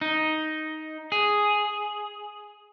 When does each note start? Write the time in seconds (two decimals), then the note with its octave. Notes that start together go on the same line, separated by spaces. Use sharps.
0.01 D#4
1.12 G#4